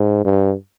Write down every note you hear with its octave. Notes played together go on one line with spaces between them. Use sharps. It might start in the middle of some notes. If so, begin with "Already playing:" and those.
Already playing: G#2
G2